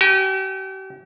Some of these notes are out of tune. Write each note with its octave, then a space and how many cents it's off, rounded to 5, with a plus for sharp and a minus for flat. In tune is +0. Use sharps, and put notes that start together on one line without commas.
G4 -40 G#5 -20